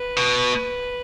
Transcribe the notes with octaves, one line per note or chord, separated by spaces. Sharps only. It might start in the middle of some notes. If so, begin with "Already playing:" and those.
Already playing: B4
B2